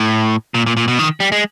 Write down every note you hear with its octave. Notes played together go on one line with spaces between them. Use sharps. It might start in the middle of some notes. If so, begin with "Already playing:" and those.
Already playing: A2
A#2
A#2
A#2
B2
D#3
G3
G#3